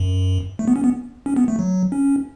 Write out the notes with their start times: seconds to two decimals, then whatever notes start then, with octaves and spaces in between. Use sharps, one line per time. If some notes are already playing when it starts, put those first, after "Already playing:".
Already playing: F#2
0.59 A3
0.68 B3
0.76 C#4
0.84 B3
1.26 C#4
1.36 B3
1.48 A3
1.59 F#3
1.92 C#4